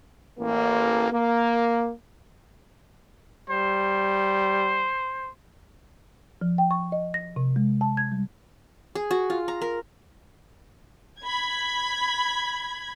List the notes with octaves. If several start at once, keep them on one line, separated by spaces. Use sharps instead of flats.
A1 A#3
A#3
G3 C5
F3
G5
C#6
D#5
A#6
C3
G#3
A5
G#6
G3
G#4
F#4
F4
A#5
A#4
B5 G#6